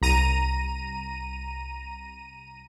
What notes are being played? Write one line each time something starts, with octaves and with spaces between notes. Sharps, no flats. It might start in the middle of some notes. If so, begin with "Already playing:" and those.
C2 A#5 D#7